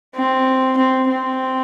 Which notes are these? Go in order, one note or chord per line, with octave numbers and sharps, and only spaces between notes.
C4
C4
C4